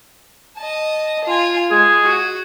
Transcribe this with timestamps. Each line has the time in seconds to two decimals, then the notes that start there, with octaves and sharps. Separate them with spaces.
0.56 D#5 A5
1.24 F4 G#5
1.71 G#3 G#4
2.03 F#4